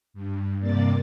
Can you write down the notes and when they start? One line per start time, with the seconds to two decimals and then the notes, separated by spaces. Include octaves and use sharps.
0.14 G2
0.59 G2 C3 A#3 D5 A6